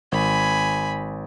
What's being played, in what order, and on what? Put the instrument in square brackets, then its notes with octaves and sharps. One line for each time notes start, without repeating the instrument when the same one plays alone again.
[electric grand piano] G#1 [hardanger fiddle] G#5 B5